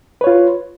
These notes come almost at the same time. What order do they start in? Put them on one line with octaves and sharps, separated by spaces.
B4 C#5 F4